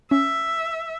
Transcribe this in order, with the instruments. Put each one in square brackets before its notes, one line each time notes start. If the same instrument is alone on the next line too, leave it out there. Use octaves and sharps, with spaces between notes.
[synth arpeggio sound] C#4 [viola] E5